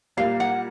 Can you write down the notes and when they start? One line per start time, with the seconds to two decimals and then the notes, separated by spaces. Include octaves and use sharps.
0.17 A#2 G3 A#3 F5
0.40 F#5